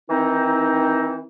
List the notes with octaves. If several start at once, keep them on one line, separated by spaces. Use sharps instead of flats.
D#3 E3 C4 D#4